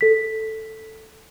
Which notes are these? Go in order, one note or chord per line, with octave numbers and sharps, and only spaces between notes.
A4 B6